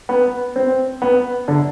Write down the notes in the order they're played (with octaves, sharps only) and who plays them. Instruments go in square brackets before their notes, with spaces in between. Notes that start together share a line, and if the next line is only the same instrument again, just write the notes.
[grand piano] B3
C4
B3
D3